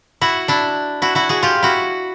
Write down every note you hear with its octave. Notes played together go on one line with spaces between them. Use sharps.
E4 F#4
D4 E4
E4 F#4
E4 F#4
F#4 G#4
F4 G4
E4 F#4